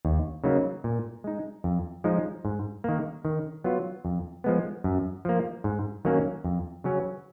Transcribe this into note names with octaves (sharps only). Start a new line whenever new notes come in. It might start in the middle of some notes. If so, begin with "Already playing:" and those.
D#2
C#3 F#3 A#3 D#4
A#2
G#3 D#4
F2
F3 G#3 D#4
G#2
D#3 A#3
D#3
F#3 B3 F4
F2
F3 G#3 B3
F#2
F3 A#3
G#2
D#3 F#3 A#3 C#4
F2
C#3 F#3 C#4